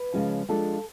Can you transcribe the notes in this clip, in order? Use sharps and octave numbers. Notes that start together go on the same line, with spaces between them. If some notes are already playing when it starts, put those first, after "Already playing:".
Already playing: B4
C#3 F3 G#3 C#4 F4
F3 G#3 D4 F4 A4